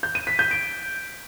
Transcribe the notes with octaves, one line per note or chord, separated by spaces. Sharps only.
G6
D#7
B6
G6
D7